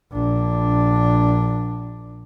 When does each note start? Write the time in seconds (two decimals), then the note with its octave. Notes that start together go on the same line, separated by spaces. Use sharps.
0.12 A#1 D4